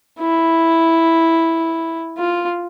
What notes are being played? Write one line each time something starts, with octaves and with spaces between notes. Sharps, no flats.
E4
F4